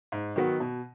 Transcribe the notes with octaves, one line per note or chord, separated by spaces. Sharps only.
G#2
D#3 F#3 B3 F#4
B2